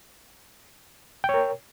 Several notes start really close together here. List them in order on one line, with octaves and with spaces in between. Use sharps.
G5 C#5 A#4